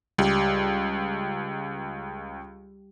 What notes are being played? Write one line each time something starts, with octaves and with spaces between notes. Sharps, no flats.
C#2 G3 G4